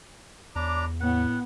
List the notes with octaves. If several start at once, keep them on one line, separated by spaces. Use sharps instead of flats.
E2 D4 C#5 A#5 B5 D6
A2 B3 F#5